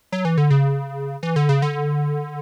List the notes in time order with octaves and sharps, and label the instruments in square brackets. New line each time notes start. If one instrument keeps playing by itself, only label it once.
[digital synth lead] F#3
E3
D3
C#3
E3
D3
C#3
D3